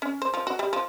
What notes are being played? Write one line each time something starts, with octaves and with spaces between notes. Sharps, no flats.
C#4
C5
F3
F#4
G3
F3